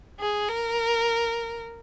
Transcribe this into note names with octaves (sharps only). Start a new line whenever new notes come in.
G#4
A#4